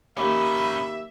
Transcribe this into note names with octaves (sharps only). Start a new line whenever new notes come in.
D#2 C#4 D#4 E5 B5